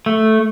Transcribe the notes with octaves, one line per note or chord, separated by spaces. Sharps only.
A3